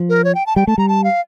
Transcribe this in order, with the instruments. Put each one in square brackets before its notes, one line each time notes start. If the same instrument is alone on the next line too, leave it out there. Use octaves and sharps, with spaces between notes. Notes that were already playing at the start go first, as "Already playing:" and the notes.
Already playing: [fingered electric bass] F3
[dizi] A#4
C#5
G5
A5
[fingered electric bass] G3 [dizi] G5
[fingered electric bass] A3 [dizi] A5
[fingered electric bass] G3 [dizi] A#5
[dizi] A5
F5